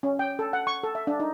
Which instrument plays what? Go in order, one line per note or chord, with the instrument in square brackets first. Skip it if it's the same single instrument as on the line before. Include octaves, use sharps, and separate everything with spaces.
[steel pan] C#4
G5
A4
F#5
C#6
A4
E5
D4
D#4